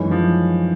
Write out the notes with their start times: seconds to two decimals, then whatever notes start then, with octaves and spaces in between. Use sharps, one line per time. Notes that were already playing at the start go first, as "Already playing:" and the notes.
Already playing: F#2 D#3 E3 G#3 C#4
0.11 F3